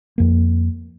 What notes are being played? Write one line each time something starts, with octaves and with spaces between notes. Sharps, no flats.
F2 A#3